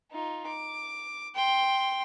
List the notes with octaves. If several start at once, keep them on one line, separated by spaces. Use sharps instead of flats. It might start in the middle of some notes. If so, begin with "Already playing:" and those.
D#4 F4
D6
G5 C6